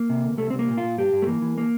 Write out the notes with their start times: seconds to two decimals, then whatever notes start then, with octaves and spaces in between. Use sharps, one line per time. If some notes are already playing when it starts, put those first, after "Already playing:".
Already playing: A#3
0.10 C3
0.24 D2
0.38 C2 A3
0.50 C2 C4
0.59 A#3
0.68 A#2
0.77 F4
0.83 A#2
0.97 G2 G4
1.13 G2
1.22 A3
1.27 E3 A#3
1.42 E3
1.58 A#3